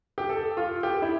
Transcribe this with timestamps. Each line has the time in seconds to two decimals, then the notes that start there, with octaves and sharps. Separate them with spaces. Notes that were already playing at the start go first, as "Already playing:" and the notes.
0.18 G4
0.29 A4
0.57 F4
0.83 G4
1.02 E4